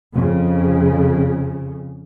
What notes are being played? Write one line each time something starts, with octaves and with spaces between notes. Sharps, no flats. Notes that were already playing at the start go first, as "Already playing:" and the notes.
F2 C#3